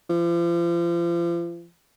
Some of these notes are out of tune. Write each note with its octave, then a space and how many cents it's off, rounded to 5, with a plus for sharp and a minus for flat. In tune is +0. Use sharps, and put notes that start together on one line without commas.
F3 -40